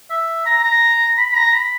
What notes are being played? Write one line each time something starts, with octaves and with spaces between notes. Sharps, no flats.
E5
A#5
A#5
B5
A#5
B5